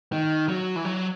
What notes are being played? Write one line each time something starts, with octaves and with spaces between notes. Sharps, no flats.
D#3
F#3
E3
F#3